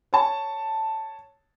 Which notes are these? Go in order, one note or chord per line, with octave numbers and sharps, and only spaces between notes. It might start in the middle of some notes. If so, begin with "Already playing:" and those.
C#5 A5